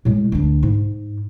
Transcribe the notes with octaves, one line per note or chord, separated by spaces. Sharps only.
A2 G#3
D2 D4
G#2